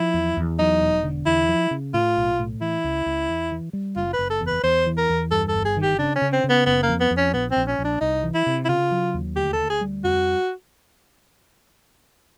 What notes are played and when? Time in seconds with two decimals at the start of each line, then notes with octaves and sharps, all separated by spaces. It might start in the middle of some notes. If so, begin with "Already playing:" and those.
Already playing: F3 E4
0.14 E2
0.37 E2
0.59 F#3 D#4
0.81 E1
1.04 D3
1.26 E2 E4
1.49 F3
1.71 C#3
1.94 A2 F4
2.17 B1
2.39 A2
2.61 E3 E4
2.84 C#2
3.06 C#2
3.29 E2
3.52 E3
3.73 G3
3.96 F#1 F4
4.13 B4
4.19 F#1
4.30 A4
4.41 E2
4.47 B4
4.63 E2 C5
4.86 E3
4.97 A#4
5.09 E2
5.31 G2 A4
5.48 A4
5.54 G1
5.65 G#4
5.77 D#3
5.82 G4
5.99 C#3 D4
6.16 C#4
6.22 C#3
6.33 C4
6.44 C#3
6.50 B3
6.66 F#1 B3
6.83 A#3
6.89 F2
7.00 B3
7.11 F2
7.17 C#4
7.34 A#1 B3
7.51 C4
7.56 A#1
7.68 C#4
7.79 A#1
7.84 D4
8.01 C2 D#4
8.23 E3
8.35 E4
8.46 C3
8.65 E4
8.69 C#3 F4
8.91 F#3
9.14 D#2
9.36 D2 G4
9.53 A4
9.59 D2
9.70 G#4
9.81 G3
10.04 F2 F#4